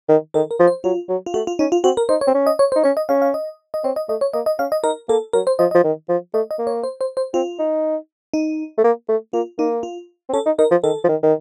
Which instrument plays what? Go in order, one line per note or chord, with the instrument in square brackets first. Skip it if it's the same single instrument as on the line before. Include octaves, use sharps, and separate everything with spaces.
[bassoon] D#3
[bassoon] D#3 [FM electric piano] A4
[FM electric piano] A#4
[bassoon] F3
[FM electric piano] C5
[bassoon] F#3 [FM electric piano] F4
[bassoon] F#3
[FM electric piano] F4
[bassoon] A3 [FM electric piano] F#4
[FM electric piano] F4
[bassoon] C#4 [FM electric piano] D#4
[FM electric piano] F4
[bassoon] C4 [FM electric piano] F#4
[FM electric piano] A#4
[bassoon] D#4 [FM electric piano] C5
[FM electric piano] C#5
[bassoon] C4
C#4
[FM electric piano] D#5
C#5
C5
[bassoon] D#4
[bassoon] C#4 [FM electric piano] C#5
[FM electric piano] D#5
[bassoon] C#4 [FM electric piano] F5
[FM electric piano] F5
D#5
D#5
[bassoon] C4 [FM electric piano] C#5
[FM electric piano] D#5
[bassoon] A3 [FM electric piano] D#5
[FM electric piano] C#5
[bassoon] A#3 [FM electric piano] D#5
[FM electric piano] D#5
[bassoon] C#4 [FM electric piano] F5
[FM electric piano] D#5
[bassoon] D#4 [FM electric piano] A#4
[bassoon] A#3 [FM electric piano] A4
[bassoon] F#3 [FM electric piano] A#4
[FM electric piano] C5
[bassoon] F3 [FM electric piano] D#5
[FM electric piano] D#5
[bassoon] F3
D#3
F3
[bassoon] A3 [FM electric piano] D#5
[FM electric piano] D#5
[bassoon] A#3
[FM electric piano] C#5
C5
C5
C5
[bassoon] C4 [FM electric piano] F4
[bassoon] D#4
[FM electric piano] D#4
[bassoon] A3
A#3
A3
[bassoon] A#3 [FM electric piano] F4
[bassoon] A#3 [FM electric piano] D#4
[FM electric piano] F4
[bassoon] C4
[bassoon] C#4 [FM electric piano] A4
[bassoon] D#4
[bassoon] D#4 [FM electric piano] A#4
[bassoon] F3
[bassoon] D#3 [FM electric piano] A4
[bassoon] F3
D#3
D#3